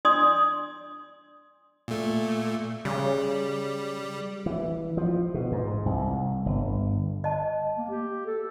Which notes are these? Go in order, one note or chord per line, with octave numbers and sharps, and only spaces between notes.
D4 D5 C6 D#6
A#2 A3
C#3 G3
E3
F3
B2
G#2
C2
G1
D#5 A5
A#3
G4
A4